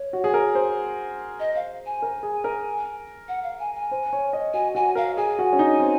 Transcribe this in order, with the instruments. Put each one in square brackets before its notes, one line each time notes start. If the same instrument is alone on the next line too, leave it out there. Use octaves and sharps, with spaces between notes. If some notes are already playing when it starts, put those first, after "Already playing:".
Already playing: [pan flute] C#5
[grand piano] F#4
G#4
A#4
C5
[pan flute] D#5
F5
G#5
[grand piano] A#4
G#4
A#4
[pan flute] F#5
F5
G#5
G#5
[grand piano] C5
C#5
D#5
[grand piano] F#4 [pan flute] G#5
[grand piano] F#4 [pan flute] G#5
[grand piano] A#4 [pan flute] F5
[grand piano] G#4 [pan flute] G#5
[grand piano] F#4
C#4
D#4
C4